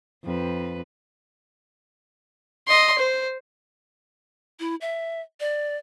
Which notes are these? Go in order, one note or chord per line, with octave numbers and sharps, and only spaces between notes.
F2 B4
D#5 C6
C5
E4
E5
D5